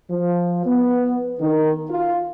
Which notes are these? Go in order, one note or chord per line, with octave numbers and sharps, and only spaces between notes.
F3
B3
D#3
F4